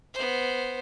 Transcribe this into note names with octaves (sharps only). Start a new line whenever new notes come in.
B3 C5